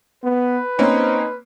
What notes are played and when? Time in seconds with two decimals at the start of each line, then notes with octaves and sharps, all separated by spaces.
0.24 B3 B4
0.79 A#3 C4 C#4 D#4 C5